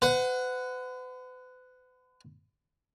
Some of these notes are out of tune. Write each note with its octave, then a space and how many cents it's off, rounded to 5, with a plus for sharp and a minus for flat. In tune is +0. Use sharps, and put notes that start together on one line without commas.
B4 +45 F#5 +0